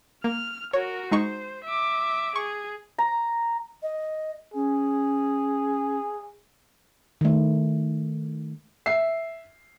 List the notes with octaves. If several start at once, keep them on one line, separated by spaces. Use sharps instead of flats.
A#3 F6
F#4 A#4 C#5
G#3 D#4 C5 C#6
E5 D6
G#4 C#6
A#5
D#5
C#4 G#4
D#3 A3
E5 C7